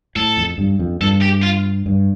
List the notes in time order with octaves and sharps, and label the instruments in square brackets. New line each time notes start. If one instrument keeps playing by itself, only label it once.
[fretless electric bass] A2 [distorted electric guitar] A4
[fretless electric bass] F2
G2
F2
[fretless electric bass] G2 [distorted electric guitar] A4
[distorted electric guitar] G4
F4
[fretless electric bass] G2